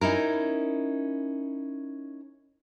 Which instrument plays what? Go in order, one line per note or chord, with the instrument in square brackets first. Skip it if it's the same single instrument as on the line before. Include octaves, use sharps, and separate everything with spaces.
[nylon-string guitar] C#4 D#4 E4 A#4